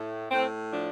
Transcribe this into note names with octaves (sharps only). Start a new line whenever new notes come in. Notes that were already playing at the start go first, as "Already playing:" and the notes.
Already playing: A2
A2 C4
F3 D4